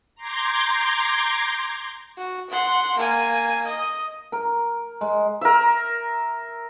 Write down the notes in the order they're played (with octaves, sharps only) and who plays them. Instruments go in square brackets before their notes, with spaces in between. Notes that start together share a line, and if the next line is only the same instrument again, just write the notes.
[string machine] A#5 C6 D6 G6 G#6
[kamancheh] F#4
F#5 C6
A#3 G#5
D#5
[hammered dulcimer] A#4
G#3
[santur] A#4 E5